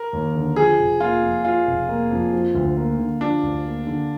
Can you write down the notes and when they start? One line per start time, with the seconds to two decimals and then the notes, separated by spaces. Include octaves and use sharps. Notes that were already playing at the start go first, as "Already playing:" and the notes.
Already playing: A#4
0.13 D#2
0.35 D3
0.56 F3 G#4
0.79 F1
1.00 A#3 F4
1.22 F2
1.45 F3 F4
1.67 F1
1.89 A#3
2.11 F2
2.33 F3
2.55 D2
2.77 A#3
2.99 D3
3.21 F3 D4
3.43 D2
3.64 A#3
3.87 D3